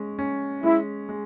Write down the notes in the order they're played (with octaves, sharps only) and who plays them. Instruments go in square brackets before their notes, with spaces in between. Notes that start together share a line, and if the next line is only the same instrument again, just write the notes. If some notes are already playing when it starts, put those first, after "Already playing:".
Already playing: [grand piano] G#3 C#4
C#4
[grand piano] G#3 [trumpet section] E4
[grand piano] G#3